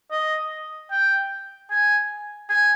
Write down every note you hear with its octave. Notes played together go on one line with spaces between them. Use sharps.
D#5
G5
G#5
G#5